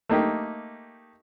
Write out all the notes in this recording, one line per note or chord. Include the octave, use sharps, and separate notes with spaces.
A3 A#3 D#4 G4